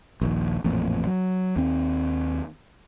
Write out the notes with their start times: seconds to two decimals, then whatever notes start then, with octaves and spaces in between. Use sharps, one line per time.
0.21 A#1 D#2
0.64 A1 F2 A#2
1.07 F#3
1.56 D#2 C4